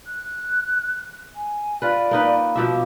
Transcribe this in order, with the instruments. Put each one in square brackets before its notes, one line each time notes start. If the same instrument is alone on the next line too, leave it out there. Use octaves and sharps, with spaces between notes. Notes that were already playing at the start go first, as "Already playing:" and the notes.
[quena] F#6
G#5
[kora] F4 B4 [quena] D5
[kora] A#3 D#4 B4
[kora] B2 F3 E5 [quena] D6